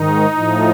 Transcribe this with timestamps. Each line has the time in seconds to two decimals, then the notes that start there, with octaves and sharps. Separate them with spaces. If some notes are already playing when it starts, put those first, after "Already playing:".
Already playing: G#2 D#3 D#4
0.35 A2 F3